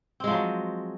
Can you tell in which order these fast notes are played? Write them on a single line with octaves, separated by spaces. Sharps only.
C4 G#3 F3 F#3